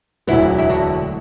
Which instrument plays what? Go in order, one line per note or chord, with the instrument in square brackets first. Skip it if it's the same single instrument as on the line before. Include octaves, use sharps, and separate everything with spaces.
[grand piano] E1 D2 D3 F#3 [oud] B3 E4
[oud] E4
D4 F#4